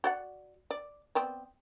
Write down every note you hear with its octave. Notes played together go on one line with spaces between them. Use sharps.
F#4 D5 F#5
D5
B3 C4 D5